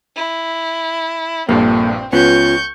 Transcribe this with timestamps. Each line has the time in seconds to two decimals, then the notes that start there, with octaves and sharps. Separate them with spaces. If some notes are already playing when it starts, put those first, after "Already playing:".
0.16 E4
1.49 A#1 G2 A#2 A#3 C4 A4
2.13 C#2 B3 C#4 F4 C#6 G6